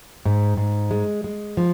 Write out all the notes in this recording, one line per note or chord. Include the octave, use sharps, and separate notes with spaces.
G#2
G#2
G#3
G#3
F3